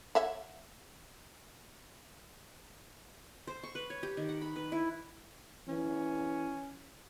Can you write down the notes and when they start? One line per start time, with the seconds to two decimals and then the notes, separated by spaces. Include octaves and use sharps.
0.15 C#5 E5 F#5
3.47 C5
3.63 C#6
3.75 B4
3.90 C#5
4.03 G4
4.17 D#3
4.29 F#5
4.41 B5
4.56 B4
4.72 E4
5.68 E3 C#4